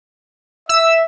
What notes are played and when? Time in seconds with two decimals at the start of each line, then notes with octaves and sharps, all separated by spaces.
0.69 E5 E6